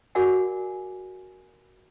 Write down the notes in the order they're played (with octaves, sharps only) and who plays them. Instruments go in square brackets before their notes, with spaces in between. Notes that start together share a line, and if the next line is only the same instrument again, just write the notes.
[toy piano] F#4 G#4 A#4 D5 F#5 G#5